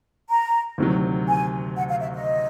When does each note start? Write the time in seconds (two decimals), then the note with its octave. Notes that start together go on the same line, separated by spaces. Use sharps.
0.29 A#5
0.78 D2 C3 D#3 F#3
1.27 G#5
1.77 F#5
1.89 F5
2.01 E5
2.13 D#5